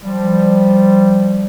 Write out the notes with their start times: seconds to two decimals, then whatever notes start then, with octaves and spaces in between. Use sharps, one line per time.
0.04 F3 G3